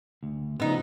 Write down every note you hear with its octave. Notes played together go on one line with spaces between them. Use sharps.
D2
A2 C#3 F3 B3 D#4